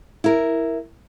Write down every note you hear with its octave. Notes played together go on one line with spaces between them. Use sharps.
E4 A#4